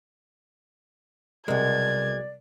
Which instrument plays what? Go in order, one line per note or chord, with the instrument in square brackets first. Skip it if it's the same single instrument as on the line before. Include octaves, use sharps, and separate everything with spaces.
[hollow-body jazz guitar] B1 G#3 [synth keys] C3 G3 A#4 [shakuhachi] D5 [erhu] G#6